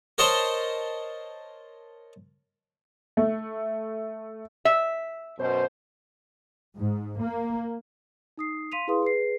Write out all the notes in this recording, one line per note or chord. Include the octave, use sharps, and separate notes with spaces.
A#4 C5 C#5 D#5 A5 C6
A3
E5
F#2 B2 C5
G#2
A#3
D#4 D#6 C7
F5 C6 B6 D#7 F7
E4 G#4 B4 F5 C6 D#6
G#4 B4 C7